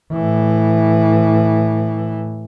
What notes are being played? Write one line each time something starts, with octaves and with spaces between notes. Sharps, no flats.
A2 E3